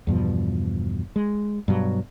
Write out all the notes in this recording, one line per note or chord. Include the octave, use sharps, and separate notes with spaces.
E2 G2 B2 F3
G#3
G2 B2 F#3